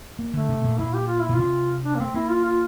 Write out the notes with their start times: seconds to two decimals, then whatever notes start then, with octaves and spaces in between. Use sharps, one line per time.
0.19 A#3
0.34 D3 A3
0.49 C3
0.64 A#2
0.79 A#2 E4
0.94 G4
1.07 F4
1.21 E4
1.29 A#2
1.34 C3 F4
1.85 D4
1.95 A#3
2.00 A3 C4
2.14 A#3 E4
2.30 F4
2.45 F4